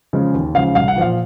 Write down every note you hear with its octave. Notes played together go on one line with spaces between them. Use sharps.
C#3 F3 G#3
D#2
C#3 F3 G#3 F5
C2 F5
F#5
A#2 F3 F5